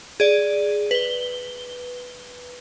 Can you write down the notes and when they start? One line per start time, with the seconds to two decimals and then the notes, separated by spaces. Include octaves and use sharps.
0.20 G#4 D5
0.91 B4 G7